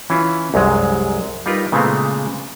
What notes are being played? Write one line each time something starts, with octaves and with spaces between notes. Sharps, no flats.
E3 C#4 E4 F4
C2 F#2 F#3 G#3
G3 D#4 F4 A#4 B4
A#2 C#3 G#3 A3 B3 C4